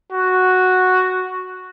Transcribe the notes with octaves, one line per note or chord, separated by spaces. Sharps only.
F#4